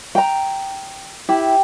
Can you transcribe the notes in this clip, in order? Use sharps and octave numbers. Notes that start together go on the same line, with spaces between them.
G5 A#5
E4 G4